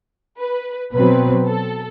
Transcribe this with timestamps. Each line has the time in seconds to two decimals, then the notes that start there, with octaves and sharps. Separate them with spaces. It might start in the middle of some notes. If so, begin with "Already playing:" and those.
0.39 B4
0.92 B2 F#3 C4 B4
1.46 A4